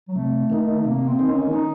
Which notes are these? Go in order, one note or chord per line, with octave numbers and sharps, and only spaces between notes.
F#3
C3 A3
D#3 A#3 D#4
C3 A#3
C4
D#3 A#3 D#4
C#4
D#3 D#4